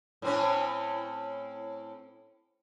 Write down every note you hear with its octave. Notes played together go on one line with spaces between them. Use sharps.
A2 C4 C#4